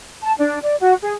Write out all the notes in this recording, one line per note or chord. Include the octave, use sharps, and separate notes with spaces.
A5
D4
D5
F#4
G#4